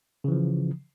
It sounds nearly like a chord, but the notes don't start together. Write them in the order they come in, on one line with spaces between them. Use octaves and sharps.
C#3 E3 F3